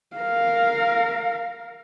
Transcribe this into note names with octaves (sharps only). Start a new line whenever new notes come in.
A#4 F5